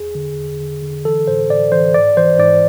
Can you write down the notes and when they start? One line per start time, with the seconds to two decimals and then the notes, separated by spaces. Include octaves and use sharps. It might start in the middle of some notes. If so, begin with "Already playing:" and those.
Already playing: E2 G#4
0.15 D3
0.38 E2
0.60 D3
0.82 D3
1.05 E3 A4
1.28 A2 C5
1.50 A2 D5
1.72 E3 C5
1.94 G#2 D5
2.17 E3 C5
2.39 G#2 D5